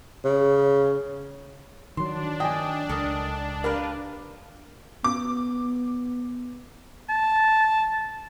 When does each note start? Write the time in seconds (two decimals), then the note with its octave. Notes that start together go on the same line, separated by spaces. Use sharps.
0.25 C#3
1.97 D#3 F#3 D4 C6
2.40 D#5 G5 G#5
2.89 C#2 A4 A#4 D#5
3.64 G4 A#4 B4 F5
5.04 B3 D6
7.09 A5